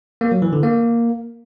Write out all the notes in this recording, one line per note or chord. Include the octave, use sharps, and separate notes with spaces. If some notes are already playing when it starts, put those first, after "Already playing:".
A#3
F#3
E3
D3
A#3